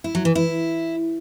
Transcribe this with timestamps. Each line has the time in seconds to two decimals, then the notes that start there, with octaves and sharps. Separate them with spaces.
0.04 E4
0.15 F#3
0.25 E3
0.35 E4